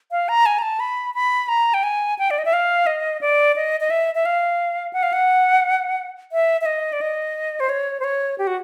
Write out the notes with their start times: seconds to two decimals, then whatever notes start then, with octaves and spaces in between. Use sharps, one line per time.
0.11 F5
0.29 A#5
0.46 G#5
0.58 A#5
0.62 A5
0.80 B5
1.14 B5
1.49 A#5
1.74 G5
1.83 G#5
2.19 G5
2.31 D5
2.38 D#5
2.45 E5
2.53 F5
2.86 D#5
3.21 D5
3.56 D#5
3.80 D#5
3.90 E5
4.15 E5
4.26 F5
4.93 F#5
5.03 F5
5.13 F#5
6.32 E5
6.61 E5
6.66 D#5
6.93 D5
7.01 D#5
7.60 C5
7.69 C#5
8.00 C5
8.04 C#5
8.38 G4
8.47 F#4